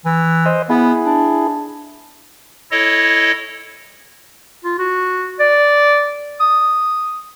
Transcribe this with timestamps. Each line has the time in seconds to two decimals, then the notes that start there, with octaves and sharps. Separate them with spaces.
0.05 E3
0.46 C5 D#5
0.70 B3 E4 G#4
1.05 D4
2.71 E4 A4 C#5 D#5
4.64 F4
4.79 F#4
5.39 D5
6.40 D#6